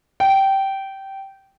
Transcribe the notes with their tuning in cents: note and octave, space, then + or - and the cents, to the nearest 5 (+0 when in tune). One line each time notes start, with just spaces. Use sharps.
G5 -15